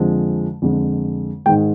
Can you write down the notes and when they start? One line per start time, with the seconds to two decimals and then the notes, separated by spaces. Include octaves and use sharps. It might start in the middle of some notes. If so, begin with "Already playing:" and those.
Already playing: F2 D3 F3 G#3
0.62 F2 D3 G#3
1.46 G#2 D#3 G#3 G5